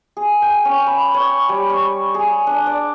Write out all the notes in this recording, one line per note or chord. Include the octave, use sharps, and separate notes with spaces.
G#4
G5
C#4
B5
C#5
G3
C#6
G#4
D4
D5